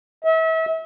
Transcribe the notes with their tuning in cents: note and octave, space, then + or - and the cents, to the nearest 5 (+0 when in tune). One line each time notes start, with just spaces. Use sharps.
E5 -35